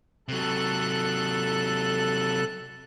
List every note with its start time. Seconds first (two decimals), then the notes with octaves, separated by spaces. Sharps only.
0.28 C3 F#3 A4 F#6